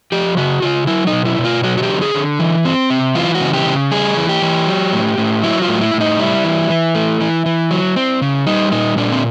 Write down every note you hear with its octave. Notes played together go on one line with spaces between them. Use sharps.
F3 G4
C#3 F#4
C#3 F4
F#3 E4
D#4
B2
E4
B2
F4
F#3 F#4
F#4
G4
D3
G#4
D3
E3
C4
C3
E3 F4
F#4
C#3
G4
C#3
G3 G#4
E3
G4
E3
F#3
A2
A2
F#3 E4
F4
A2
E4
A2
D#4
G3 E4
E3
E3
A3
E3
E3
F#3
C4
C#3
G3 D#4
A#2 D#4
A#2 D4
C4